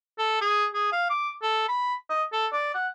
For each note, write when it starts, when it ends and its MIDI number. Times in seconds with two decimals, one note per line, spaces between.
0.18 0.40 69
0.41 0.65 68
0.74 0.92 68
0.92 1.08 77
1.10 1.31 86
1.42 1.64 69
1.68 1.95 83
2.09 2.24 75
2.32 2.47 69
2.52 2.71 74
2.75 2.88 78